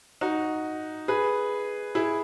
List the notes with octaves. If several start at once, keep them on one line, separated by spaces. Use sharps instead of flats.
D#4 F#4
G#4 B4
E4 G#4